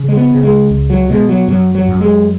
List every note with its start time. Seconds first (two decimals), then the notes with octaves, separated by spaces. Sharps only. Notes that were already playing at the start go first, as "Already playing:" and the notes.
Already playing: C#3
0.08 G#3
0.17 B3
0.31 C#3
0.43 G#3
0.71 C#2
0.90 F#3
1.09 B2 G#3
1.29 F#3
1.48 F#2 F#3
1.75 F#3
1.88 F#2
2.01 G#3